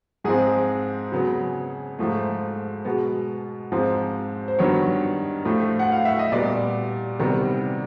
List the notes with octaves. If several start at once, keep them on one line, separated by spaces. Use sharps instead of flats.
G#2 F3 G#3 C4 G#4
C#3 F#3 B3
G#2 F3 A3
B2 G#3 B3
G#2 F3 G#3 C4
C5
G2 D#3 F#3 B3 C#5
A2 F3 A3
F#5
F5
E5
D#5
A#2 G3 B3 D5
C3 D#3 G3 B3